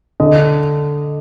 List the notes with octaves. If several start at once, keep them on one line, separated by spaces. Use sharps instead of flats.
D3 D#5